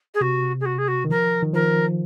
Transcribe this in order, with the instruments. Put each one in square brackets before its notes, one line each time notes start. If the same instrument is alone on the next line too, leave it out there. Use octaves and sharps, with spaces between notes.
[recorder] G#4
[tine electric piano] C3 [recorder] F#4
[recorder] G#4
F#4
G#4
F#4
[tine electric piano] D#3
[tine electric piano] F3 [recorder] A#4
[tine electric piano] D#3
[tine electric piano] F3 [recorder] A#4